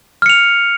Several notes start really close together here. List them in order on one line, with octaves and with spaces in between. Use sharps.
F6 C#7 F7